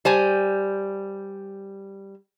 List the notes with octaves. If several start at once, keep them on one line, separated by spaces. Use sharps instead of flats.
G3 C5 G#5